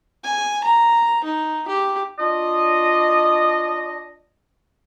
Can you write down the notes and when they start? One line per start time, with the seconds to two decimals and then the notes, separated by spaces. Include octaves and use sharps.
0.24 G#5
0.64 A#5
1.24 D#4
1.68 G4
2.19 D4 F4 D#5